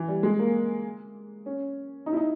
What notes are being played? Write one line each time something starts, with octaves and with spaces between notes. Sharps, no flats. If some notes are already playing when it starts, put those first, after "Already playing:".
Already playing: E3
G3
G#3
A#3
C#4
D#4
E4
D#4